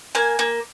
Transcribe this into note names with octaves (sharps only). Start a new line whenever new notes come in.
A#3 G#5
A#3